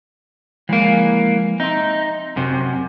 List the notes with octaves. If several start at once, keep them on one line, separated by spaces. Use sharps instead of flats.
E3 F3 G#3 A#3
C4 D#4 E5 C6
F#2 C3